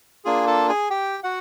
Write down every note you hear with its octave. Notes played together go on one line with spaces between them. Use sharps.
A#3 D4 F4 G#4 G#5
A4 A5
G#4 G#5
G4 G5
F#4 F#5